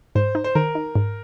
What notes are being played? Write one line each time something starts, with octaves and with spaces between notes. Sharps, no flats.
G#2 C5
D#4
C5
D#3 A#4
D#4
G#2